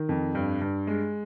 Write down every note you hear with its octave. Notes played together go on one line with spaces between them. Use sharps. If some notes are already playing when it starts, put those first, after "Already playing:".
Already playing: D#3
F2
G2
G2
G#3